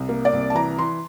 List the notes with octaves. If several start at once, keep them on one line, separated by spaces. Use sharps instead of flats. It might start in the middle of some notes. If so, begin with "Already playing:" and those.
Already playing: C2
A#3
D5
C2
A5
E3 A#5
E3 C6